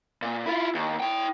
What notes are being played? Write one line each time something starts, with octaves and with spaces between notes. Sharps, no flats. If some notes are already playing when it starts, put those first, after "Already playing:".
A#2
E4 F4
D#2
E4 G5